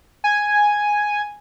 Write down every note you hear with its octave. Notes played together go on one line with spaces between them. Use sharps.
G#5